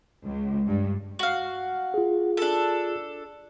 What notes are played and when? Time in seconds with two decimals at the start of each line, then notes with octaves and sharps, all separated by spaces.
0.25 C#2
0.67 G2
1.19 F#4 F5
1.94 F4 G#4
2.37 D4 A4